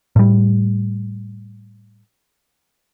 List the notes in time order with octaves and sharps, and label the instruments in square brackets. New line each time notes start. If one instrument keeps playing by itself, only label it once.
[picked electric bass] A2 G3